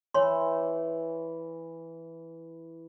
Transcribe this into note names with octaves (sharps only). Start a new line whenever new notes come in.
E3 C#5 C6